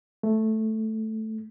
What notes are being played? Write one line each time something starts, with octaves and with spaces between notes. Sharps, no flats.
A3